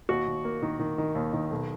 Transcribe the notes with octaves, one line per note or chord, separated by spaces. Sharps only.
D#2 F#4
D#2
A#3
D#3
D#3
D#3
D#2
D#3
B1